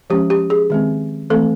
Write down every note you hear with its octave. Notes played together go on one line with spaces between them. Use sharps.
F3 G#3 C#4 G4
G4
G#4
D#3 G#3 C4
E3 A3 C4 A4